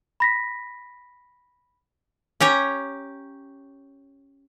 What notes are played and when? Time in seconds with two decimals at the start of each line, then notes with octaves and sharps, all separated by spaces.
0.20 B5 A#6 B6
2.40 C#4 G4 C#5 A#5